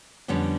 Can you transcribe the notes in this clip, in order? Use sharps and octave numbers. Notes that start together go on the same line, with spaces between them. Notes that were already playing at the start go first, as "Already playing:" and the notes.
F2 D3 G3 B3 C#4